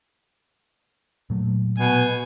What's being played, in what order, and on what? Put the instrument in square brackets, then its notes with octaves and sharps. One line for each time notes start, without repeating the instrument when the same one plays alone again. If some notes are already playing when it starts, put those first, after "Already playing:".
[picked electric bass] A#2 F#3 A3
[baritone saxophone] B2 [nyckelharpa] G#5